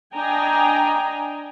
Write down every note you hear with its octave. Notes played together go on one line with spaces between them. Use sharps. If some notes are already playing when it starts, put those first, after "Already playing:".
D4 D#5 G5 G#5 A#5